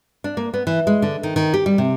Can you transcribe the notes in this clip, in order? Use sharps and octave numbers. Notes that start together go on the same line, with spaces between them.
D4
A#3
B3
E3
G#3
D3
D#3
D#3
G4
G3
C3